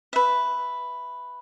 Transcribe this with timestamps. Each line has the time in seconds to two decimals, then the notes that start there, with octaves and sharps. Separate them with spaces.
0.13 B4 E5